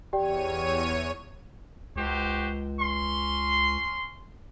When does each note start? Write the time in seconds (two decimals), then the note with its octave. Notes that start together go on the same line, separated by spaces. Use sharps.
0.13 E2 G4 C#5 D5 G5 D#7
1.96 C#2 F#4 G4 C5
2.80 C#4 C6